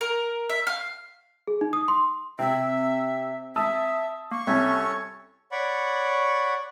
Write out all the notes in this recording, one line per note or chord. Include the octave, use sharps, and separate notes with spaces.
A#4
E5
F5
G#4
D#4
D#6
C6
C3 C4 E5
E5 A5 D#6 E6
A#3 C#6
C2 C#4 A4 C#5 E5
C#5 D5 F#5 B5 C#6